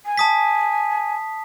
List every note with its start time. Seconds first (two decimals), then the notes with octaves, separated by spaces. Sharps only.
0.06 G#5
0.18 A5 D#6 B6